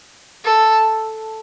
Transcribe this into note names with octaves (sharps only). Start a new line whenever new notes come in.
A4